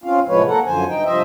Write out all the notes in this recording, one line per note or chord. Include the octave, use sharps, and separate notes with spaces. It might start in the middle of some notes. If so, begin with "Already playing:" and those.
C4 C#4 F4 F5
A2 C3 F3 G#3 B4 C#5
A#3 A4 A#4 F#5
F#2 D3 F3 C5 G#5
G2 D#4 G5
G2 C3 F3 C5 D#5 E5